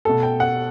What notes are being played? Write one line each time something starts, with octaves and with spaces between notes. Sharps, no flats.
B2 A3 A4
G5
F#5